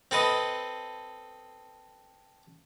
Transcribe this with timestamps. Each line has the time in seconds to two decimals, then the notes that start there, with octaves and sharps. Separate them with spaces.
0.11 C4 A4 B4 D#5